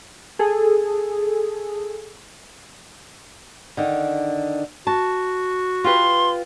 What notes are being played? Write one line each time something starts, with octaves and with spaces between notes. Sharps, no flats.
G#4 A4
D3 D#3
F#4 A5
F4 G4 B4 C6